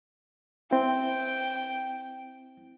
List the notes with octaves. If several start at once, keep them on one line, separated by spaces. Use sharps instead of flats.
C4 E4 G5